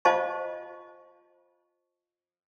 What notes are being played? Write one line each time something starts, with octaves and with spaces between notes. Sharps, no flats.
F4 C5 D#5 F5 A5 C#6